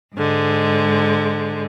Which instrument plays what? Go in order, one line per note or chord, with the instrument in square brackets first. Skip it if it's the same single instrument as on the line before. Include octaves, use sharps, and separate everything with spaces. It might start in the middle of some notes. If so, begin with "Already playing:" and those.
[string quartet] G#2 D3 G#3